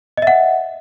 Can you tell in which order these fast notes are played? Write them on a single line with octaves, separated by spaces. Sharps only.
D#5 E5 F#5